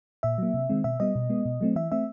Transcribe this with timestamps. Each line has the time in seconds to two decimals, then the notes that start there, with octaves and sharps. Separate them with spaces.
0.23 A#2 E5
0.38 F#3 A#3
0.54 C3
0.69 D#3 G#3 C4
0.84 B2 E5
1.00 G3 B3 D#5
1.15 B2
1.30 G#3 B3
1.46 B2
1.61 F#3 A3 C4
1.76 E3 E5
1.92 A3 C4 E5